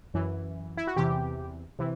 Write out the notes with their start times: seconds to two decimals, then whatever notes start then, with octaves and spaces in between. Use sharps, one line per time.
0.14 F#2 E3
0.77 E4
0.87 F#4
0.96 E2 C3 E3 G4
1.79 C3 E3